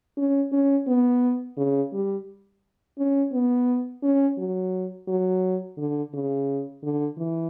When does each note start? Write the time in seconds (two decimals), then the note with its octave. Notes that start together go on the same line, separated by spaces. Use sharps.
0.18 C#4
0.52 C#4
0.87 B3
1.57 C#3
1.93 G3
2.99 C#4
3.33 B3
4.03 C#4
4.38 F#3
5.08 F#3
5.78 D3
6.14 C#3
6.83 D3
7.18 E3